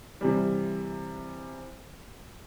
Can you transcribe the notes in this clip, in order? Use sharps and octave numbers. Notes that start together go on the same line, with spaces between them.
C3 E3 G3